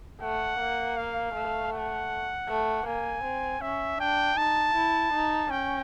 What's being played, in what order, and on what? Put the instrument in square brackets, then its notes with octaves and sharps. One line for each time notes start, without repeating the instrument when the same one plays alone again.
[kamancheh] A3 [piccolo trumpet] F#5
[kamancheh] A#3
[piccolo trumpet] F5
[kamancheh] A3
[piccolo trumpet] F#5
[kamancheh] A3
[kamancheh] A#3 [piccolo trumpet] G#5
[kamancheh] C4
[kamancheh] C#4 [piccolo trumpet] E5
[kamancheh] D4 [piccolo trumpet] G5
[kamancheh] D#4 [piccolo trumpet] A5
[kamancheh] E4
D#4
[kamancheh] C#4 [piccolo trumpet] G5